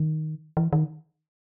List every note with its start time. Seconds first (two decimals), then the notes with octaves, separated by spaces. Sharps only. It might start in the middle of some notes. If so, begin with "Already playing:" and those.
Already playing: D#3
0.57 E3
0.73 D#3